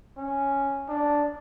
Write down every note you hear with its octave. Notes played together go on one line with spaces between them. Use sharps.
C#4
D4